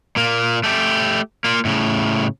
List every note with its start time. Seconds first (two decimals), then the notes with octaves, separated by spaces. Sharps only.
0.16 A#2 A#3
0.64 A3 G4
1.44 A#3 F4
1.65 A2 C#3